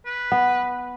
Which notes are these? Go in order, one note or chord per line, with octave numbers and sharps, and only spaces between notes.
B4
B3 F#5